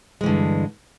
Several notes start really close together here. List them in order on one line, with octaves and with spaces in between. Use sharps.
G#3 E3 D3 G2